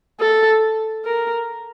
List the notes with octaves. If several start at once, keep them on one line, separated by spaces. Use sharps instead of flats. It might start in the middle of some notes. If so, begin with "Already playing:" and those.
A4
A#4